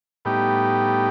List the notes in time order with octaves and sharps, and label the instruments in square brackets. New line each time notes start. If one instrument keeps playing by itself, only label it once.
[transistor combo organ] A2 G3 B3 D#4 G4